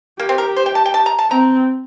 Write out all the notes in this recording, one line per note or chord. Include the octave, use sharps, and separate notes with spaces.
A#3 G4
C4
A#4
C5
G5
A5
G5
A5
A#5
A5
C4 A#5